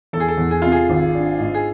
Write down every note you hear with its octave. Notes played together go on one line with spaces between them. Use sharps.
E2 A4
G#4
A4
E2
G#4
C3 F4
G#4
G#1
D4
G#2
G#4